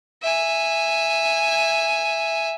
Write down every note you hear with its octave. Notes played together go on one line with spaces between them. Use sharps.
E5 G#5